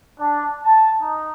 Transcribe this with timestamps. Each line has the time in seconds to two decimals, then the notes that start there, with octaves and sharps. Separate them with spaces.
0.19 D4
0.62 A5
1.01 D#4